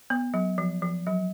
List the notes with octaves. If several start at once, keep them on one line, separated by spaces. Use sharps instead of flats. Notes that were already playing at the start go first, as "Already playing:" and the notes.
B3
F#3
F3
F3
F#3